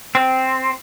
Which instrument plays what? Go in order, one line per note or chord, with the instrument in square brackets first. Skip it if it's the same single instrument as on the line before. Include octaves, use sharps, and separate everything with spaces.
[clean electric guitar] C4